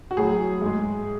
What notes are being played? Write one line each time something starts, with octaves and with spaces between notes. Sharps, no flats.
F#4
A2 F#3 G#4
G#2 G#3